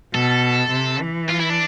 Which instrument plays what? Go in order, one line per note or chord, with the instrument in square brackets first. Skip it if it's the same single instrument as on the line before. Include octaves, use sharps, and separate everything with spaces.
[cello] B2 [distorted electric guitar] A4
[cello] C3
E3
[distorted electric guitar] F4
E4
D4